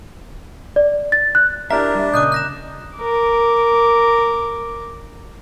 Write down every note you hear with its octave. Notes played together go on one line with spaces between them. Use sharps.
D5
A6
F#6
D4 E4 G4 A#4 E5 A#5
G3 E5
A#2 C#3 D#5 D6 F#6 G6
F#6 A#6 E7
A#4 D6